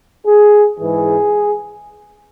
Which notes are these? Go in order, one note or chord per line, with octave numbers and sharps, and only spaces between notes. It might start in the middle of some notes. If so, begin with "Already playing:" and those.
G#4
G#2 E3 G#4